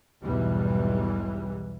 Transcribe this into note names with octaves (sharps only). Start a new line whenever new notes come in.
B1 E2 G#2 E3 G3